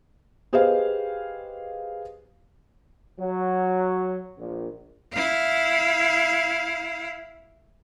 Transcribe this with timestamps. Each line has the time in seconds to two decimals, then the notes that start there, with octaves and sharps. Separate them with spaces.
0.53 G4 G#4 B4 C5 D#5 F5
3.20 F#3
4.38 A#1
5.14 E4 F5